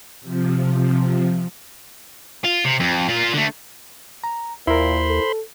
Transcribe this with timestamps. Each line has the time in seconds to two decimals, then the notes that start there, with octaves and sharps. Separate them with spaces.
0.21 C3 F3
2.45 F4
2.65 C3
2.80 F2
3.08 A#2 F4
3.33 D3 A3
4.24 A#5
4.67 D#2 A#2 E4 A#4 C5 B5 C6
5.08 A4